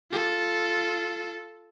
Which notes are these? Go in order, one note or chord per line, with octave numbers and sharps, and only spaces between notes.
F4 A4